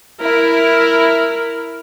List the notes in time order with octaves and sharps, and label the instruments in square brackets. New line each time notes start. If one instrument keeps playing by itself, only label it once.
[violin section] E4 [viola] A#4